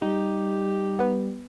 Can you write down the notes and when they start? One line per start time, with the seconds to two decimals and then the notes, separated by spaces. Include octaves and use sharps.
0.02 G3 D#4 G4
0.99 B3 B4